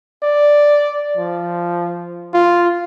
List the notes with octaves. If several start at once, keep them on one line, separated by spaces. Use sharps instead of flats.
D5
F3
F4